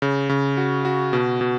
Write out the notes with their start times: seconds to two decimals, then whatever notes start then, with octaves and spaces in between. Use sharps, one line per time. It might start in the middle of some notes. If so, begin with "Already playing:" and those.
0.02 C#3
0.29 C#3
0.57 F#4
0.85 F#4
1.13 B2
1.41 B2